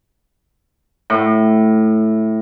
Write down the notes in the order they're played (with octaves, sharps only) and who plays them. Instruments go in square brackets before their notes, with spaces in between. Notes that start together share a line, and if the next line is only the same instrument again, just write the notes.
[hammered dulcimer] A2